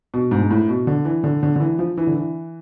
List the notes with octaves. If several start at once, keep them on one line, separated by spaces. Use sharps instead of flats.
B2
G#2
G#2
A2
B2
D3
E3
D3
D3
D3
E3
F3
E3
D3
E3